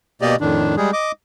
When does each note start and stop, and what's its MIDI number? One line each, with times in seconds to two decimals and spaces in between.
0.22 0.36 47
0.22 0.36 58
0.22 0.36 67
0.22 0.36 74
0.22 0.36 75
0.41 0.75 41
0.41 0.75 45
0.41 0.75 51
0.41 0.75 62
0.77 0.91 55
0.77 0.91 56
0.77 0.91 68
0.93 1.12 75
0.93 1.12 86